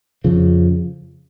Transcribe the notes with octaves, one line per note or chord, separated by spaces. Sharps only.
F2 C#3 F3